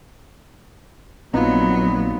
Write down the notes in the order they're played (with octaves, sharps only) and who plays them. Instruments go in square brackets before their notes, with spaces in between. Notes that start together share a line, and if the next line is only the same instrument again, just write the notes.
[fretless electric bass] A#1 C4 [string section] A#2 F#3 [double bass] B3 [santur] D#4 F4